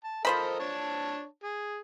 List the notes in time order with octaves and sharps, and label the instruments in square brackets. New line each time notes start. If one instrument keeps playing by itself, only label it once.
[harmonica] A5
[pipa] F3 C5 B5 [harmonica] A4 A#4 D#5
[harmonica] D4 C#5 A5
G#4